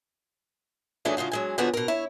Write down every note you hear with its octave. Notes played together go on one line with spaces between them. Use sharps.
D#3 E3 F#3 A3 D4 G#4
C#3 G#3 F4 F#4
F#3 G#3 G#5
D3 F3 B3 C#4 F#4 G#4
B2 A#4
E4 C#5